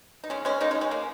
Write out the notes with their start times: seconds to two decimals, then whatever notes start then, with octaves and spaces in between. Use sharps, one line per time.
0.24 D#4
0.30 G#3 C#4
0.45 G#3 C#4
0.61 A#3 D#4
0.71 G#3 C#4
0.81 G#3 C#4
0.91 A#3